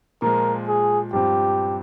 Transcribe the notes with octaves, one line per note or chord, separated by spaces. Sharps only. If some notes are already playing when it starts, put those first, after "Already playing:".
A#2 F3 G#3 A#4
G#4
G2 F3 C4 F4 G4